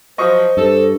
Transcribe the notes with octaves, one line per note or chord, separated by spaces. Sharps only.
F3 F#3 C5 D#5 C#6 D#6
G2 A4